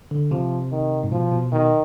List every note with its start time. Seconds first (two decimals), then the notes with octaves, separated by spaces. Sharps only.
0.11 D3
0.31 C3 F3
0.72 D#3
1.03 G#2
1.12 B2 F3
1.32 B2
1.52 B2 D#3